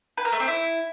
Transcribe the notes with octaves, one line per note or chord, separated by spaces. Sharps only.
B4
A#4
A3
C4
E4